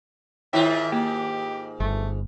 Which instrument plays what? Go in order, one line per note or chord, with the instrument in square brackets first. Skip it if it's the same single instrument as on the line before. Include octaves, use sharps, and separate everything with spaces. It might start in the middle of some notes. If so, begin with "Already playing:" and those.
[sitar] G#2 D#3 F4 [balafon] E4 C#5 G5 [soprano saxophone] E5
[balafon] A#3 [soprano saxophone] G4
[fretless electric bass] G1 [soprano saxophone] A3